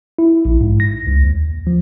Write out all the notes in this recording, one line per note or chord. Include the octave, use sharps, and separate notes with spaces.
E4
A#1
G#2
A#6
C#2
D#2
F3